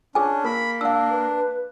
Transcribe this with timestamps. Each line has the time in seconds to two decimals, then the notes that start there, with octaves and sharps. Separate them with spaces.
0.15 C#4 D4 G#4 G#5
0.45 A#3 A#4 B5
0.81 D4 F5 E6
1.11 B4